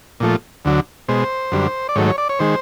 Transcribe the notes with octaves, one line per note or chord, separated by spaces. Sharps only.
A#2 F3 A3
D2 D3 F#3
B2 G#3 C5
F#2 D3 G3
D5
G#2 D#3 F#3 A3 C#5
C#5
D5
C#5
D#3 G#3 C5